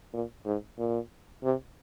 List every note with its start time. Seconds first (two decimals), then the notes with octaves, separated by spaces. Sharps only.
0.13 A#2
0.45 G#2
0.79 A#2
1.43 C3